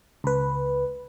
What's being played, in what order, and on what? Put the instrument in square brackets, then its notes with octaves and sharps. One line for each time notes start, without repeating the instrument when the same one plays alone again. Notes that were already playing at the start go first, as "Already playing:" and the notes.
[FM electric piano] C#2 B4